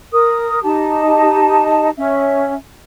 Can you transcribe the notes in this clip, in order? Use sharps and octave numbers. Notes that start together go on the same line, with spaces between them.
A#4 D#6
D#4 G4 A5
C#4 E5